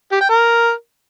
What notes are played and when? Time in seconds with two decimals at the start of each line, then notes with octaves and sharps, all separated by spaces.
0.12 G4
0.21 G5
0.30 A#4